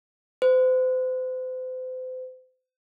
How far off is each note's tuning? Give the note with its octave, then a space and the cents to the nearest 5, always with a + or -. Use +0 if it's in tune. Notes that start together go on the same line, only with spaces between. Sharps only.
C5 -40